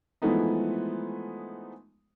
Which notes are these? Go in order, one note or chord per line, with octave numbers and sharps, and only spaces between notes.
E3 F3 G#3 A3 B3 D#4